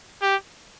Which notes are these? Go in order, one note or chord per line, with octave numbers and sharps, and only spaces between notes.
G4